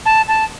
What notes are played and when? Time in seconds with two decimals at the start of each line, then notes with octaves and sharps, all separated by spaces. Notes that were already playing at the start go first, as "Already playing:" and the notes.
0.06 A5
0.28 A5